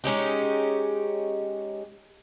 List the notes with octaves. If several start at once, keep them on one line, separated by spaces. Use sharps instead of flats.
G#3 C#4 D#4 G4